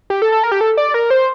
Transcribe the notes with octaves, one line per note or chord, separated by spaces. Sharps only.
G4
A4
A4
A#4
G4
A4
D5
A#4
C5